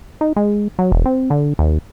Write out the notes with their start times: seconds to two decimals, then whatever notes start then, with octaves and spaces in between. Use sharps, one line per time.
0.21 D#4
0.36 G#3
0.79 F#3
0.92 E1
1.06 C4
1.30 D3
1.59 D#2